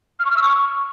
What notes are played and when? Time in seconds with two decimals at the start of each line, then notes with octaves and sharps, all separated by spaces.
0.19 F6
0.25 C#6
0.31 F6
0.37 E6
0.42 C#6